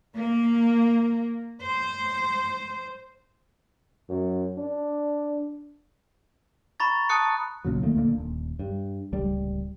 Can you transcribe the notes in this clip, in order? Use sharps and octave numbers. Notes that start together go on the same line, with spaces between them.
A#3
C5
F#2
D4
A#5 B5 C#6 A6
A5 D#6 F#6 C#7
B1 A#2 C#3 F#3
D2 D#3 A3 A#3
D2 A#2 D3 A#3
D#1
G2
D1 C#2 G3